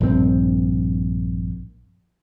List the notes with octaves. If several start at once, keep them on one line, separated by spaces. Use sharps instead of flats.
A#1 G2 C#3 C4